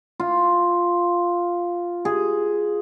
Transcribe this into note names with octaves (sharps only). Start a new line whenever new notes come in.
F4
G#4